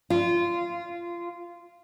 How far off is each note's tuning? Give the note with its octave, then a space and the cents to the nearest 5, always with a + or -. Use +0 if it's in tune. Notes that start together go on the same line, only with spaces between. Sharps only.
F4 -20